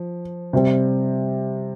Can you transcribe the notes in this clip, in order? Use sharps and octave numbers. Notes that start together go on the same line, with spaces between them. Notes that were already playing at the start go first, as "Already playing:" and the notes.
Already playing: F3
C3 G3 C4